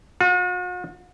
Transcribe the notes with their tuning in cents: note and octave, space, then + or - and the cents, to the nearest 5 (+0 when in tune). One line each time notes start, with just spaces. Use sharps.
F#4 -45